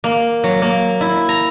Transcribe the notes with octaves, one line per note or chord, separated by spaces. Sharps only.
A#3
F#3
A#3
E4
A#5